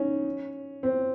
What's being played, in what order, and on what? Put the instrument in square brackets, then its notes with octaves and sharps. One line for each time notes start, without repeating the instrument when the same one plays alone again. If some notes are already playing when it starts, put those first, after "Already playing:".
Already playing: [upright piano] C#4 D#4
C4